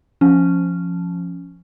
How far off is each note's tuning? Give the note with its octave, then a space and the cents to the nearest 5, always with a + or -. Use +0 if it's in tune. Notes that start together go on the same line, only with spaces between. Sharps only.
F3 +0 C#4 +0